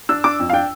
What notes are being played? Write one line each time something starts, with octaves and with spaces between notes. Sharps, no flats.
D4 E6
D4 D6
F2
F5
D4 G5